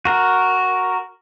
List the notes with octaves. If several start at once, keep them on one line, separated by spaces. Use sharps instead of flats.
F#4 A#4